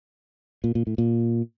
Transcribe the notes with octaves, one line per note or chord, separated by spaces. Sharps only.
A#2
A#2
A2
A#2